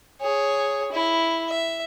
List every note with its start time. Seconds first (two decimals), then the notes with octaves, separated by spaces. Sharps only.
0.21 G#4 C#5
0.92 E4
1.49 E5